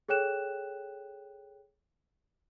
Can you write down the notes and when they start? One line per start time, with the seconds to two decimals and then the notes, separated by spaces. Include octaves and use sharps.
0.09 G#4 A4 C#5 G5 F#6 E7